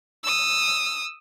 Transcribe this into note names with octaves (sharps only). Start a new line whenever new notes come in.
D#6 E6